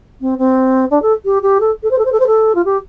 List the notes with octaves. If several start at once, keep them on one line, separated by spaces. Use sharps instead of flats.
C4
C4
D4
A4
G4
G4
A4
A4
C5
A4
C5
A4
C5
A4
F4
G4